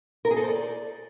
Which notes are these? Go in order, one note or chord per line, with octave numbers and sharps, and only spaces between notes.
A#4
G#4
A4
C5
D5